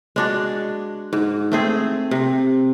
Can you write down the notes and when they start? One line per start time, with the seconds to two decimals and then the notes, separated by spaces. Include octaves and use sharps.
0.16 G#3 D4 F#4
1.13 G#2
1.52 A3 C4 G#4
2.11 C3